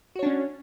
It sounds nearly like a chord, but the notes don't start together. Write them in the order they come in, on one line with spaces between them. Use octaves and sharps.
F#4 C#5 D4 C#4